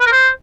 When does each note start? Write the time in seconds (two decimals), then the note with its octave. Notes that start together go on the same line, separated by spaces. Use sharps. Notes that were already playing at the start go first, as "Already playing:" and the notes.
0.01 B4
0.06 A#4
0.12 C5